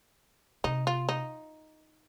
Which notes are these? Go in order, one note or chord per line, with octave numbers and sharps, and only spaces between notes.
C3 D#4
F4
D#4